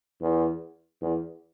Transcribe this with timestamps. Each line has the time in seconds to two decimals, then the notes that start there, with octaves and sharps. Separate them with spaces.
0.21 E2
1.02 E2